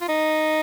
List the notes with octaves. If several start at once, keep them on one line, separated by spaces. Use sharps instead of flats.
F4
D#4